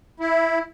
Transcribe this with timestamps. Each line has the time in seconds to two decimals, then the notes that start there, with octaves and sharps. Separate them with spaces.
0.20 E4